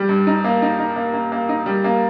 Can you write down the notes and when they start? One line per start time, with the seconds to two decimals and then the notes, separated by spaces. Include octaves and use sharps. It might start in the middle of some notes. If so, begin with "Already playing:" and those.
Already playing: G3
0.09 G2
0.27 D#4
0.44 A#3
0.62 D#4
0.79 D#4
0.96 A#3
1.13 A#3
1.32 A#3
1.49 D#4
1.66 G3
1.84 A#3